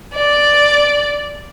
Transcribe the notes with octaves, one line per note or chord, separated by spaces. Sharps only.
D5